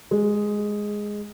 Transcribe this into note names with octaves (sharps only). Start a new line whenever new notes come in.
G#3